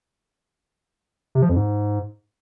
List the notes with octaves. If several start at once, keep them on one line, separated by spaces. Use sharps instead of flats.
C3
F3
F2
G#2